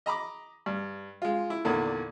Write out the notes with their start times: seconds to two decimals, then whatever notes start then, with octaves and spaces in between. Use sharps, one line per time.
0.06 D#5 A#5 B5 D6
0.66 G2
1.22 G#3 F4
1.50 E4
1.65 E2 A#2 D3 D#3